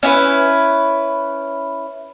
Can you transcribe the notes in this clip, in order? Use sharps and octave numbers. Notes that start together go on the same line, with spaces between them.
C#4 E4 B4